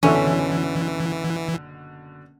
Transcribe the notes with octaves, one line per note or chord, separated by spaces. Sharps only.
F#1 B2 D3 E3 C#4 D4 A4 E5